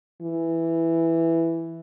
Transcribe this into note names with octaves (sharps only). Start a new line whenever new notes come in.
E3